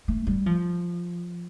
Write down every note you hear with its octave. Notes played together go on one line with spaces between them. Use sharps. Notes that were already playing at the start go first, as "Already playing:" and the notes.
A3
G3
F3